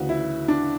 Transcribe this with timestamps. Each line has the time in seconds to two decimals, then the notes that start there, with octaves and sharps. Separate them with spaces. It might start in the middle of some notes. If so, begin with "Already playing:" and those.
Already playing: D2 C#3 E3 F#4
0.09 E4
0.48 D4